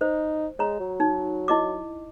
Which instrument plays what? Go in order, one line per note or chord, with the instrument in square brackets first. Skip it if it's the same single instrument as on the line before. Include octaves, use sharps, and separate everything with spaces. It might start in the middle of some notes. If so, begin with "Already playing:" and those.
[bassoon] D#4 [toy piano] C5
[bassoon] G#3 [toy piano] C#5 A#5
[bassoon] F#3
[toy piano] D#4
E4 D#5 D6